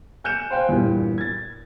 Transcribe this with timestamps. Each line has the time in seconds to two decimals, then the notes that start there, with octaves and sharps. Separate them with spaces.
0.24 G#5 F#6 G6 C#7 E7
0.50 C5 F5 G5 G#5 F#6
0.69 E2 G2 A#2
1.18 G#6 A6